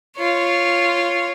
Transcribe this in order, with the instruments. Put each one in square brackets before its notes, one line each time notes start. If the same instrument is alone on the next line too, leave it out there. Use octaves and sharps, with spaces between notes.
[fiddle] F4 C#5